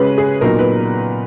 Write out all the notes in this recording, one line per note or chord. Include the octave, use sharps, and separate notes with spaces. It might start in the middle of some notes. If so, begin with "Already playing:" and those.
Already playing: C#3 G#3 C#4 B4
G#4
A#2 F#3 B3 D#4 A#4
B4